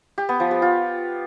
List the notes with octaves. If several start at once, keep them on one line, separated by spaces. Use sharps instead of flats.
G4
B3
F3
G4
F4